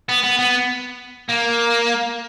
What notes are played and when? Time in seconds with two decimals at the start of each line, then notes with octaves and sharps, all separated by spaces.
0.09 B3
0.24 B3
0.39 B3
1.30 A#3